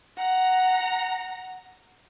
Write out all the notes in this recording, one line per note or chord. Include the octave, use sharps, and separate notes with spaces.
F#5 A#5